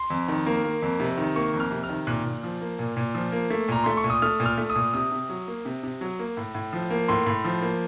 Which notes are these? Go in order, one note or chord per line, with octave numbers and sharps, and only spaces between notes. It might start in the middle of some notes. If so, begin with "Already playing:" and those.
Already playing: C6
F2
D#3
A#3
A#3
F2
C3
D#3
A#3 C#6
F2
F6
C3
F6
D#3
A#2 F#6
A#2
F3
A#3
A#2
A#2
F3
A#3
A3
A#2 A#5
A3 C6
C#6
A#2
D#6
A3 F6
A#2
F6
A3
D#6
A#2
C3 D#6
C3
F#3
A#3
C3
C3
F#3
A#3
A2
A2
F3
A#3
A2 C6
A2
F3
A#3